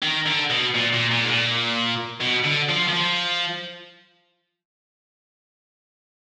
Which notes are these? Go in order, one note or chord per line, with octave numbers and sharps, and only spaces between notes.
D#3
D3
B2
A#2
A#2
A#2
G#2
A#2
B2
D3
F3
D#3
F3